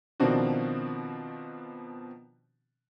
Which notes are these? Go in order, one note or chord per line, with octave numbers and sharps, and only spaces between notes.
B2 D#3 F3 C4 D4 F#4